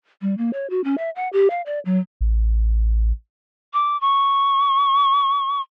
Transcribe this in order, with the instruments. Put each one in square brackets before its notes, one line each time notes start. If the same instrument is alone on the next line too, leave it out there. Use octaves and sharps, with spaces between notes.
[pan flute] G3
A#3
C#5
F#4
C#4
E5
F#5
G4
F5
D5
F#3
[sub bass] A1
[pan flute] D6
C#6